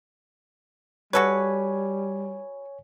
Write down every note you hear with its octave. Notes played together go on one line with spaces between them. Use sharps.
G3 F#4 A4 B4 C#5 G#5